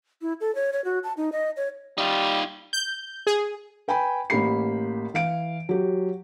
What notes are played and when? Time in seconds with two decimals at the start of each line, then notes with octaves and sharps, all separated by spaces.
0.22 E4
0.41 A4
0.55 C#5
0.73 C#5
0.85 F#4
1.04 A5
1.17 D#4
1.32 D#5
1.57 C#5
1.98 G3 D#4 F4
2.73 G6
3.27 G#4
3.88 B4 G5 G#5 B5
4.30 A1 A#3 G4 B5 C7
5.14 E3 F5 D7
5.69 F#3 G4